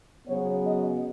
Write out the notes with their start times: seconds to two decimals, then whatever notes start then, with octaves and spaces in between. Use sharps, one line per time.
0.27 C#3 F#3 B3 C#5
0.65 D#5